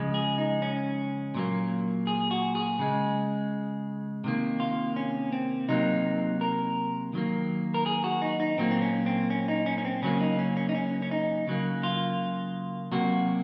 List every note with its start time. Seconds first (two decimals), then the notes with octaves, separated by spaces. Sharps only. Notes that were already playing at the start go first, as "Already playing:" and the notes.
Already playing: C#3 F3 G#3
0.14 G#4
0.38 D#4
0.62 C#4
1.35 A#2 F#3 A#3
2.07 G#4
2.31 F#4
2.55 G#4
2.79 C#3 G#3
4.24 C3 D#3 A#3
4.60 F4
4.96 C#4
5.32 C4
5.69 C3 F#3 A#3 D#4
6.41 A#4
7.13 D#3 F#3 A#3
7.74 A#4
7.86 G#4
8.04 F#4
8.22 D#4
8.40 D#4
8.58 A#2 F#3 A#3 C4
8.71 C4
8.81 C#4
9.06 C4
9.30 C#4
9.48 D#4
9.66 C#4
9.78 C#4
9.85 C4
10.02 C#3 F#3 A#3 C#4
10.21 D#4
10.39 C#4
10.57 C#4
10.69 D#4
10.75 C#4
11.02 C#4
11.11 D#4
11.47 C#3 F#3 A#3
11.83 F4
12.92 C3 F#3 A#3 F#4